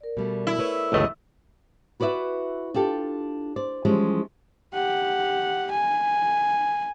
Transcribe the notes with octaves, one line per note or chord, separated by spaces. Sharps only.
A#4 D5
B2 G3 A3
E4
A3 B4 C#5
G1 C#2 E3 A3 D#5
E4 F#4 B4 D5 E5
D4 F4 G4 A4
C5 D5
E3 F3 G3 G#3 C#4
G4 F#5
G#5